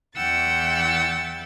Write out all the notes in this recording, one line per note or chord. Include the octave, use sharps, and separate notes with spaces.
E2 E3 F#5 G5 E6 A6